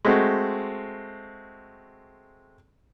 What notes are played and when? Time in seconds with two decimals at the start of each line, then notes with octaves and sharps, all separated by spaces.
0.05 G#3 A3 C4 F#4